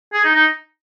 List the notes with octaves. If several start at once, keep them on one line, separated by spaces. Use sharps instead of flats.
G#4
D#4
D#4